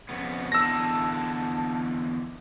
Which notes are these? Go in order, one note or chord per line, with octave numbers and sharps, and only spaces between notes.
F2 C#3 B3
E2 D3 D#4 A5 E6 A#6